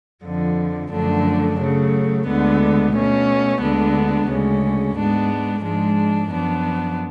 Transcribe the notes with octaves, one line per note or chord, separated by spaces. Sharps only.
F2 D3 F3
F#2 D3 F3 A3 D4
C#3 F#3 A3
D2 D3 G#3 B3
B2 A3 C#4
D2 D3 G#3 B3 D4
D2 C#3 G#3 C#4
G#2 G#3 B3 D4
G#2 F3 G#3 D4
F#2 F3 B3 D4